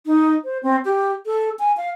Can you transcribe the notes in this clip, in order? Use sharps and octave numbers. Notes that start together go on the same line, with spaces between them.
D#4
C5
C4
G4
A4
G#5
F5